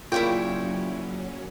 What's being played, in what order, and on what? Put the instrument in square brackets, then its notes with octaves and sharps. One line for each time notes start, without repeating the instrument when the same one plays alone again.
[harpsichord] A#2 C#3 [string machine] F#3 C#4 [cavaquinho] E4 C#5 G5 [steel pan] F4